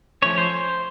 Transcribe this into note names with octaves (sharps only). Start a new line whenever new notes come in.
F3 A3 C#4 C#5
C5